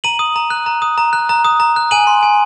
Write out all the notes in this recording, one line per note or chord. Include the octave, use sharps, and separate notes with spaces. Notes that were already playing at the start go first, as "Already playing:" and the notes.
A#5 D#7 F#7
D#6
A#5
F#6
A#5
D#6
A#5
F#6
A#5
D#6
A#5
F#6
G#5 D#7 F#7
C6
G#5